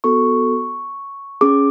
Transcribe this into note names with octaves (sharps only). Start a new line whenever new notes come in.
B3 F#4 A4 C#6
C#4 G#4 D6